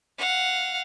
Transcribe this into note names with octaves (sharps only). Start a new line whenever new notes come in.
F5 F#5